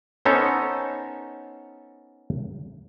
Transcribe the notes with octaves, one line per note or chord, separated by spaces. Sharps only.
B3 C#4 D#4 A4 C5 C#5